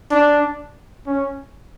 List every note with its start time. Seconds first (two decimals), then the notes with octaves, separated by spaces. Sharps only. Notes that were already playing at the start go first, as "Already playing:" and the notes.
0.11 D4
1.07 C#4